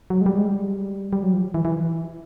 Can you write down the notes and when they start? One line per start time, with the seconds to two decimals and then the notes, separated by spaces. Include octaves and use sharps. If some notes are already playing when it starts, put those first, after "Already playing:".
0.10 F#3
0.21 G#3
0.26 G3
0.37 G#3
0.47 G3
1.13 G3
1.23 F#3
1.34 F3
1.54 E3
1.65 E3